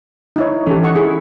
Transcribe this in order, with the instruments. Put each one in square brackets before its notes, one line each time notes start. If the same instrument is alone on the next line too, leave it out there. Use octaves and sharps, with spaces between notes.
[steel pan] D#4 E4 C#5
[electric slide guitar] E3 C#4 [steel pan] G4 A4
[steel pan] D#5 F#5 C#6
[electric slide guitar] E4 [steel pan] G#4